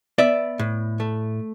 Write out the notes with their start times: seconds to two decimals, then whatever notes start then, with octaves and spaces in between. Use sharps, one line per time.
0.18 B3 D5 E5
0.59 A2
1.00 A3